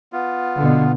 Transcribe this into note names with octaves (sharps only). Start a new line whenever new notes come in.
B3 F4
B2 D3